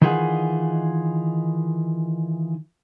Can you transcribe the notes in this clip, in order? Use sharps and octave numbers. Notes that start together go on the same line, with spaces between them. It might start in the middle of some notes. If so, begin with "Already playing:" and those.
D#3 E3 D#4 F4 G#4 F#5